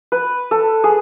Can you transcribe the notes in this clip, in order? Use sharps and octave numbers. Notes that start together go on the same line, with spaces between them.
B4
A4
G#4